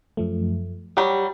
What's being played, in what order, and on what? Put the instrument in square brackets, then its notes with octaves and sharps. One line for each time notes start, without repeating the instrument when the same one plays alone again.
[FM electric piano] F#2 F3 A3
[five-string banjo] F#3 G3 [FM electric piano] G4